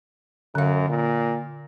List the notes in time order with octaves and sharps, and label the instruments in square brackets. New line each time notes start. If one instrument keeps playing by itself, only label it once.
[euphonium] F#2 [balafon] D3 F5
[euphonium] A#2